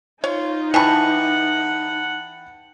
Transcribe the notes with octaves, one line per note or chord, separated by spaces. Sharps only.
D#4 F4 C#5
E3 F#5 G5 A5 B5 C#6